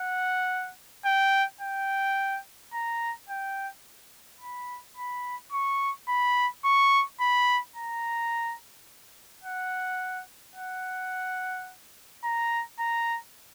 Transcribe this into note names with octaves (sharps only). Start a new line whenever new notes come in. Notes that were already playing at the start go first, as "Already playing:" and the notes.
Already playing: F#5
G5
G5
A#5
G5
B5
B5
C#6
B5
C#6
B5
A#5
F#5
F#5
A#5
A#5